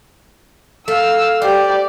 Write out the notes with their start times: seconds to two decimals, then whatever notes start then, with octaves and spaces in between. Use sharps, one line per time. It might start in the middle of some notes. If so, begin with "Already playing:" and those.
0.88 A3 F5 E6
1.42 G4 C5 D5